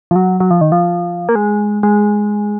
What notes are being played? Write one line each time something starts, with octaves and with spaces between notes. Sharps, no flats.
F3
F#3
F#3
F3
D#3
F3
A#3
G#3
G#3